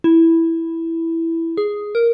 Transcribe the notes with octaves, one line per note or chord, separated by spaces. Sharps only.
E4
G#4
A#4